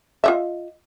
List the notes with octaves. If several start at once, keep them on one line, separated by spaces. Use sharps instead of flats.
F4 D#5 E5